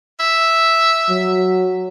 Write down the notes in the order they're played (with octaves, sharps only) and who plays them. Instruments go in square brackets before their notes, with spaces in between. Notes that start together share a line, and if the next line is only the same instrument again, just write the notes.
[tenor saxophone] E5
[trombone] F#3